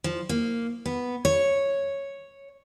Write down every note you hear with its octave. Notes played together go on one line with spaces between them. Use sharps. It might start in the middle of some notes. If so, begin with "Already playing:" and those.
F3
A#3
B3
C#5